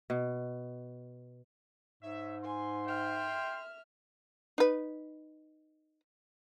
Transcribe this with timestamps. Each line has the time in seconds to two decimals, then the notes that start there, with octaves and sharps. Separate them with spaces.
0.10 B2
2.03 G#2 D#4 C#5 E5
2.44 G#5 C6
2.88 E5 G5 F6
4.58 D#4 B4